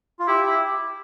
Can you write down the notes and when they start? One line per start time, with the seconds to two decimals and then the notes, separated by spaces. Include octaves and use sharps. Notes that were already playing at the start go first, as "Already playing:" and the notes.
0.19 F4
0.27 E4 G4
0.46 E4